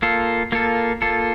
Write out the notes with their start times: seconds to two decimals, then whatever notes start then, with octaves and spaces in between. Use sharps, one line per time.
0.02 A#3 F4 A4
0.52 A#3 F4 A4
1.02 A#3 F4 A4